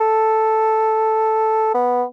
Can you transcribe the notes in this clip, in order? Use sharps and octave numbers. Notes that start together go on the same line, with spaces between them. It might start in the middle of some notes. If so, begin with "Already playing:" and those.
A4
B3